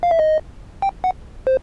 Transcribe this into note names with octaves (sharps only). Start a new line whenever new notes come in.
F5
E5
D#5
G5
F#5
C5